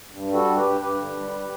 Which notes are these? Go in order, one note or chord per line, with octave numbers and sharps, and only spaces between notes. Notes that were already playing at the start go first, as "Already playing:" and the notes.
G2
G3
F#4 A4
G2
G4 B4
G2
G2 G4 B4
D3
G3